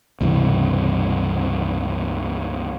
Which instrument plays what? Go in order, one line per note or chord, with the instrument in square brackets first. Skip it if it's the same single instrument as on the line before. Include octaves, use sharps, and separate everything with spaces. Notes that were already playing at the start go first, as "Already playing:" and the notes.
[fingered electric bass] C#2 G2 C3 E3